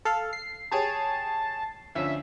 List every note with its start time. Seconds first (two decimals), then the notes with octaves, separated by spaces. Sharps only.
0.05 A4 F5
0.33 C7
0.71 G4 G#4 C#5 A5
1.95 D2 F3 C#4 E5